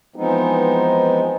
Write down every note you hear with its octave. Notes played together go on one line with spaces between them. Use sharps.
E3 F3 G#3 B3 C4 D#4